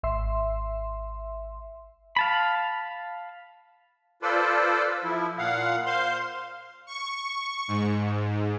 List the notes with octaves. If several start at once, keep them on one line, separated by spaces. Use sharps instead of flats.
G#1 E5 C6
F5 A5 B5
F4 A4 B4 C5 D5
F3 E4
A#2 F5 F#5
C5 F5 C6
C#6
G#2